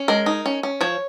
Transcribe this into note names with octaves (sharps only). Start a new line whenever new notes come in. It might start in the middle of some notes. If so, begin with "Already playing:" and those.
Already playing: C#4
G#3 A#4
D#4
C#4
C#4
F3 C#5